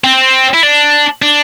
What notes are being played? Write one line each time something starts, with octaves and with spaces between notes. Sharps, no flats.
C4
E4
D4
D4